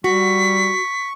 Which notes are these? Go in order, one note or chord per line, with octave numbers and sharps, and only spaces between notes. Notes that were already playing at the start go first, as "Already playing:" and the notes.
G3 F#4 C#6 B6